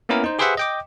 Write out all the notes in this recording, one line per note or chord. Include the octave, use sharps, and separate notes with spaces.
A#3 B3 C#4 E4 A#4
D#4 C5
G4 G#4 B4 C5 E5 F#5
D#5 G5 D6